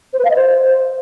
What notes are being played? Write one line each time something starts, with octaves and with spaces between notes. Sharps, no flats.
C5
B4
F5
D#5
C5